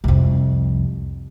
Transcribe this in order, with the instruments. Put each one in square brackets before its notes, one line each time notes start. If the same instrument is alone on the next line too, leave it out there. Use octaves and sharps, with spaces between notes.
[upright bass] C2 F2